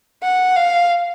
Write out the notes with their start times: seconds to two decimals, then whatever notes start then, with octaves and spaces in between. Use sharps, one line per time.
0.23 F#5
0.56 F5